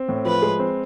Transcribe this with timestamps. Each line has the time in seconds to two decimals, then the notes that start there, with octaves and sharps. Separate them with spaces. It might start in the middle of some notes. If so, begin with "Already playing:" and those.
Already playing: C4
0.09 A2
0.25 F3 B4
0.42 G#3
0.59 C4